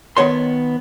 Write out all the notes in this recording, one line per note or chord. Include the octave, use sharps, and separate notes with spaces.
D#3 B3 C#5 C6